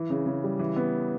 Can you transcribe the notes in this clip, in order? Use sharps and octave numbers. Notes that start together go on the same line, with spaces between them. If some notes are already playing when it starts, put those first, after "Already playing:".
Already playing: E3
C#3
C#3
G3
E3
B3